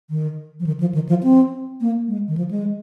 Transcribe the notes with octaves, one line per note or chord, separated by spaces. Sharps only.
D#3
F3
D#3
F3
D#3
F3
C4
A#3
G#3
D#3
F3
G#3